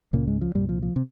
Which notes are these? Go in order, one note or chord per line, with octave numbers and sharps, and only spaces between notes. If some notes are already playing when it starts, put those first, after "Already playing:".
C#2 A#2 C#3 A#3
G#2 G#3
F3
C2 G2 A#2 G3
F3
F3
C3